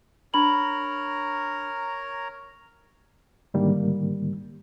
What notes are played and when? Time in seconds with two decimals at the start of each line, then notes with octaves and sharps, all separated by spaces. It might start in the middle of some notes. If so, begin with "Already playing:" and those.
0.34 D4 A#4 C#5 A#5 B5 F#7
3.54 G#2 D3 D#3 G3 A#3